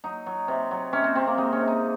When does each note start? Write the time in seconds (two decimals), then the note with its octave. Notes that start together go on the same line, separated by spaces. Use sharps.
0.04 F#3 D#4
0.26 F#3
0.48 C3
0.71 F#3
0.93 C3 C#4
1.04 C4
1.15 C3 C4
1.27 A#3
1.37 G#3 D#4
1.52 C#4
1.61 C3
1.68 D#4